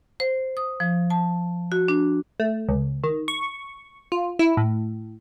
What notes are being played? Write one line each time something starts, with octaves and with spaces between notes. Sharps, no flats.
C5
D#6
F3
A5
F#4
D4
A3
C#2
D#3
C#6
F4
E4
A2